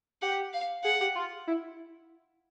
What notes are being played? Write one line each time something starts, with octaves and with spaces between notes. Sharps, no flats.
G4 F#5
F5
G#4 F#5
G4
F4
E4